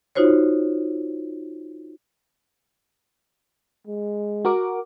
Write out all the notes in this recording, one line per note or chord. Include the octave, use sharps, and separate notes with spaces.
D#4 F4 F#4 C5 C#5
G#3
F#4 A#4 D6